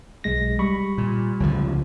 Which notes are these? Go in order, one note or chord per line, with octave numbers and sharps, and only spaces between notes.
B1 G#3 A#6
G3 B5 C#6
A#2
C#2 D3 F3